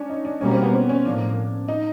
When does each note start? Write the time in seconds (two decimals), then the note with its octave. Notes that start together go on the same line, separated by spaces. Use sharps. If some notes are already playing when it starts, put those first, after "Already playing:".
Already playing: C#4 D4
0.10 D#4
0.25 D4
0.41 B2 G3 A#3 C#4
0.51 C4
0.63 B3
0.73 C4
0.89 C#4
1.04 A2 F3 A#3 D4
1.68 D#4